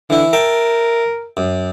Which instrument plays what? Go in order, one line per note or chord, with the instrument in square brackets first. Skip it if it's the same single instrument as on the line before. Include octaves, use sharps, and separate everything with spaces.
[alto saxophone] D3 [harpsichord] E3 E4
[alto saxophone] A#4 [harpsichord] E5 G5 A5
[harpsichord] F#2